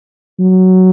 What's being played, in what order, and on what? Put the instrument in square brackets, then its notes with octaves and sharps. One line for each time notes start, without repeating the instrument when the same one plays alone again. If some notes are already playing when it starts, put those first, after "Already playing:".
[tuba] F#3